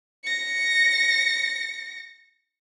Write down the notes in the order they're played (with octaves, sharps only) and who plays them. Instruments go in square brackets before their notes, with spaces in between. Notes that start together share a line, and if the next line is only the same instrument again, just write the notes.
[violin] A#6 C#7